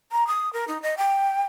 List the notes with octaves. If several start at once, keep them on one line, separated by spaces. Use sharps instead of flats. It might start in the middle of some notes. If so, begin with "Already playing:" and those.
A#5
D#6
A#4
D#4
D#5
G5